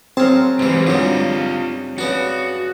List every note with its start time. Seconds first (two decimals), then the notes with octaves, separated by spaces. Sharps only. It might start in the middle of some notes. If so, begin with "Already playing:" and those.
0.17 F#3 C4 G#4 A#4 F5 A5
0.59 G#2 E3 G3 G#3
0.87 G2 C#3 F#3 G3 D#4 F4 C#5
1.98 C#3 B3 D4 F#4